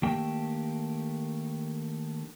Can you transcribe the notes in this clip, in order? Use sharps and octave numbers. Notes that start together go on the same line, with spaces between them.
D#3 A3 A#3 D4 G4 G5